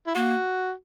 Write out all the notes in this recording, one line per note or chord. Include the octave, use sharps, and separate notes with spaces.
E4
A#3 F#4